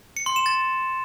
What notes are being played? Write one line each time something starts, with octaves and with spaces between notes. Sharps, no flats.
C#7
C6
E7
A6